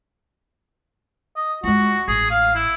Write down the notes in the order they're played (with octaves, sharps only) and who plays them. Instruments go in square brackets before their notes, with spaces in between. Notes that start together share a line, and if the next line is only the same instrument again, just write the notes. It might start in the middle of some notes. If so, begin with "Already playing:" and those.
[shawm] D#5
[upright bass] G#3 F4 [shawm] F#4
[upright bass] A1 [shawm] G#4
[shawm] F5
E4